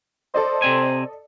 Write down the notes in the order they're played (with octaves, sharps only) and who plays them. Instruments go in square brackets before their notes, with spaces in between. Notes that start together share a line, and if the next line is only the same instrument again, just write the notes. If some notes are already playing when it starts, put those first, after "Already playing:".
[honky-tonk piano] A4 D5 D#5 [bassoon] C5
[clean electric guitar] C3 C4 G#5